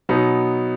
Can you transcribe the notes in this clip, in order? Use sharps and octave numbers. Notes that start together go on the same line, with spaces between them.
B2 F#3 B3 D#4